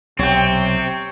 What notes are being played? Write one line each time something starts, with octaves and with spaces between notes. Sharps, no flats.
B1 C3 C4 C#5 G5